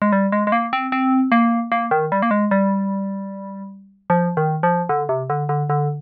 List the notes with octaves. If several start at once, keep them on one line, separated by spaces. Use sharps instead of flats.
G#3
G3
G#3
G#3
A#3
C4
C4
A#3
A#3
D#3
G3
A#3
G#3
G3
F3
D#3
F3
D3
C3
D3
D3
D3